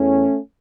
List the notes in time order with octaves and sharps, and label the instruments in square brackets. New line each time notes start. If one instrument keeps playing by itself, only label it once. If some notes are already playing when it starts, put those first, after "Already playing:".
Already playing: [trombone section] E2 E3 A3 C#4